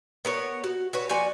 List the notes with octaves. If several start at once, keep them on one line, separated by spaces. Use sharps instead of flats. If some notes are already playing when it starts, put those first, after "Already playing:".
B3 A#4 C#5
F#4
F#4 B4 C#5
F3 F#4 D5 G#5